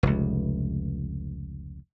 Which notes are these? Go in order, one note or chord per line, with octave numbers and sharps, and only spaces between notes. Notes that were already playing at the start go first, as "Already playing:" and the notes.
F1 C#2